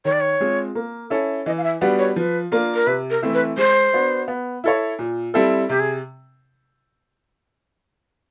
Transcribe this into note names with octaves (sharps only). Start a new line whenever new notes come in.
D#3 C#5
D5
C#5
G#3 C4 F4
A#3
C#4 E4 A4
E3 D#5
F5
E5
G3 B3 D4 F#4
C#5
F3 B4
A#3 D4 F4
A#4
C3 B4
A#4
E3 A3 C4 E4
B4
G#3 C5
B3 D4 F#4
B3
E4 A4 C#5
A#2
G3 C4 E4 A4
C3 G4
G#4